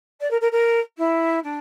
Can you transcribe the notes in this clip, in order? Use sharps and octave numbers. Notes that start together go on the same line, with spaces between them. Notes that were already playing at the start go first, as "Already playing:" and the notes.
D5
A#4
A#4
A#4
E4
D4